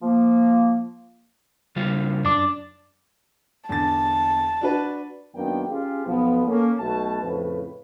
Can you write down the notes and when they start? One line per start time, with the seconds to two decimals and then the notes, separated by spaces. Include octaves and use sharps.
0.03 F3 A#3
1.76 C#3 G3 F4
2.25 F#2 D4 D6
3.69 E2 D3 A5 A6
4.61 D4 F#4 B4
5.35 F#2 D#3 A#3 B3 D4 G5
5.68 C#4 F4 G4 G#4
6.06 B1 F3 B3
6.47 A#3 C#4 A4
6.79 B1 B2 A3 A5
7.23 F2 A2 C#3 F3 B4